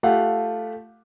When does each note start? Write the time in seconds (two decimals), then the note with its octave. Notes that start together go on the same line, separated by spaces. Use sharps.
0.03 A3 F4 G4 F5 F#5